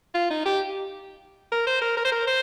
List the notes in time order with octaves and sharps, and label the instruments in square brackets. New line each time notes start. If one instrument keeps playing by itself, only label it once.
[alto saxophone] F4
D#4
G4
A#4
C5
A#4
A#4
C5
A#4
C5